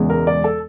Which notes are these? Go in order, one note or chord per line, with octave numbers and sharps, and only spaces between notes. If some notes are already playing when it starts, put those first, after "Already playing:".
Already playing: E1 E2 C#3 E3 G#3
A#4
D5
A4